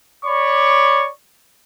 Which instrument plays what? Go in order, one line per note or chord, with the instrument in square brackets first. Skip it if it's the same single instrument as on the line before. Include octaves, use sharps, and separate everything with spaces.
[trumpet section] C#5 D5 B5 C#6 D6